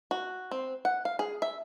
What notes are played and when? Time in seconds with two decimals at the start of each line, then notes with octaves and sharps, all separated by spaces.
0.11 F#4
0.51 C4
0.85 F#5
1.05 F5
1.19 G#4
1.42 E5